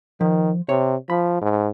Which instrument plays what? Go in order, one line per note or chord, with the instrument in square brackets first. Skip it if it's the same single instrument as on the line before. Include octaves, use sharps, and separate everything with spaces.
[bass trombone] D#3 [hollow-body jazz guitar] F3
[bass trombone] C3 [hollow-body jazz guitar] C#5
[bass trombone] F3 [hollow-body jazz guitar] B5
[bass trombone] G#2